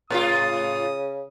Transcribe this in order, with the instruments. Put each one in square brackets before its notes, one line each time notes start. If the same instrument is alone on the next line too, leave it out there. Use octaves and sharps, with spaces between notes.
[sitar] A2 F4 [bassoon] C#3 [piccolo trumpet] D#6